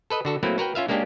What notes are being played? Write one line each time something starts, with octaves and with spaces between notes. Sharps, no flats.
A4 B4 D#5
D3 F#4 A4
F#3 A3 A#3 C4 E4
F#4 A#4 B4 G5
C#4 F4 E5 F5
G#3 A#3 C#4 D4 G4